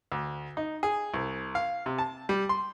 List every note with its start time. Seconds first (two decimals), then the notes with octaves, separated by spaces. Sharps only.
0.12 D2
0.57 D#4
0.83 G#4
1.14 C2
1.55 F5
1.86 C3
1.98 A5
2.29 G3
2.49 C6